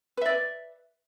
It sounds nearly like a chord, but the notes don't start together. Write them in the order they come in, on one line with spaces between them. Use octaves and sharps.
B4 E5 D5